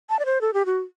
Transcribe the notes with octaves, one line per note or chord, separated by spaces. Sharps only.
A5
D5
C5
A4
G4
F#4